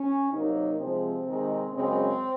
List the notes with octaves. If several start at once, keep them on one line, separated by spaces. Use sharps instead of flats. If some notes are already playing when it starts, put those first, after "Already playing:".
Already playing: C#4
C3 F#3 A#3 D#4
C3 F3 G#3 C4
C3 D#3 G#3
F#2 C#3 G#3 C4